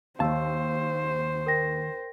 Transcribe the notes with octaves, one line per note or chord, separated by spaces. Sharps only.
D#2 D#3 C5 F5 A5 E6
A#4 G5 A#6